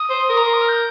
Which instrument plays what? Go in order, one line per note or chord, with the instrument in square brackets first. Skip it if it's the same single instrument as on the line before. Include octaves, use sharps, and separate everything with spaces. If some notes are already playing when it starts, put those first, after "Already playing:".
Already playing: [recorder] D#6
[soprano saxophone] C5
A#4
[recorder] A#5
C6
D#6
F6
G6